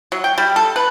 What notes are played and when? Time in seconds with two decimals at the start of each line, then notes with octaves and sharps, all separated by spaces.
0.12 F#3
0.24 G5
0.38 G3
0.56 A4
0.76 B4